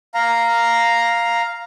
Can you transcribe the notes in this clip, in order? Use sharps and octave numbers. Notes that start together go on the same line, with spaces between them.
F5 A#5